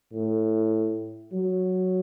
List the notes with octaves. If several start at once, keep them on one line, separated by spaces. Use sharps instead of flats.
A2
F#3